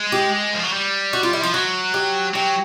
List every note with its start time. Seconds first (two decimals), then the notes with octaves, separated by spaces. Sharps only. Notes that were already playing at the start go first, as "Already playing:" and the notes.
Already playing: G#3
0.12 G4
0.54 F3
0.63 F#3
0.73 G3
1.13 F#4
1.23 F4
1.33 E4
1.42 F3 F4
1.54 F#3 F#4
1.94 G4
2.34 F#3 G4